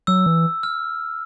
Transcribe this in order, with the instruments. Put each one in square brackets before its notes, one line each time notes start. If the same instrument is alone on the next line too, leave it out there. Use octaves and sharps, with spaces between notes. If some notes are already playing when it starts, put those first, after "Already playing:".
[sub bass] F#3 [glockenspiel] E6
[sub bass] E3
[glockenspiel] F6